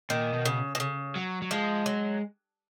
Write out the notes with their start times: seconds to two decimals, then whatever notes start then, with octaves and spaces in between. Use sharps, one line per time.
0.10 A#2 D#3
0.33 B2
0.45 C#3
0.75 B2
0.80 C#3
1.16 F#3
1.42 F#3
1.51 F3 G#3
1.86 F#3